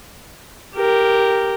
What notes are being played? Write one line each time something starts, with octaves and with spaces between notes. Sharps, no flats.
G4 A#4